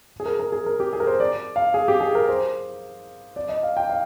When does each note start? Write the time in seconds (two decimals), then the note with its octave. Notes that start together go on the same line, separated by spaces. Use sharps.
0.20 G#4
0.26 A#4
0.40 A#4
0.52 G#4
0.66 A#4
0.80 G4
0.93 G#4
1.00 A#4
1.07 C5
1.20 D5
1.56 F5
1.74 G#4
1.88 G4
2.00 G#4
2.15 A#4
2.29 C5
3.36 D5
3.49 D#5
3.63 F5
3.77 G5
3.89 F5